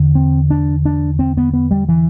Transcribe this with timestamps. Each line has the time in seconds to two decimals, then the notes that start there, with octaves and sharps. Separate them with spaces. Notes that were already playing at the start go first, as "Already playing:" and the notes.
Already playing: E2 D3
0.15 C4
0.50 D4
0.85 D4
1.19 C4
1.37 B3
1.53 B3
1.71 G3
1.89 E3